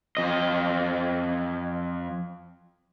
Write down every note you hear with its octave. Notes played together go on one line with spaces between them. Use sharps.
F2 D#5